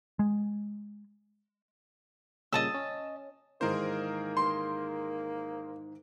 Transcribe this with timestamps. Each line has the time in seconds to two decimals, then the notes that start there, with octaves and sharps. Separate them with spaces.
0.19 G#3
2.53 G2 A#2 C#3 D#5 A5 E6
2.74 C#4
3.61 G#2 D#3 E3 A#3 G#4 A#4 C5
4.37 C6